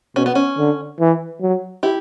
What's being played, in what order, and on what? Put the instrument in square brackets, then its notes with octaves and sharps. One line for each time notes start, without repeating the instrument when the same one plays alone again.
[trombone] B2 [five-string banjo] C#4
[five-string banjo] B3
C#4
[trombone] D3
E3
F#3
[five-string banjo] E4 G4